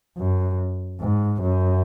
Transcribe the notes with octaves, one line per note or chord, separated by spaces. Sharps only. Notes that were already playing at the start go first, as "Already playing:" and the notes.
F#2
G#2
F#2